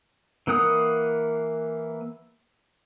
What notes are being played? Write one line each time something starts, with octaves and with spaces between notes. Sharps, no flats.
E3 A#3 F#5 D#6